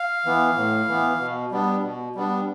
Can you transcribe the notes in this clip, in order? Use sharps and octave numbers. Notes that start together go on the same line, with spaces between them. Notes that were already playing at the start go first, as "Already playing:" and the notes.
Already playing: F5
E3 B3
A2
E3 B3
B2
G3 B3 D4
B2
G3 B3 D4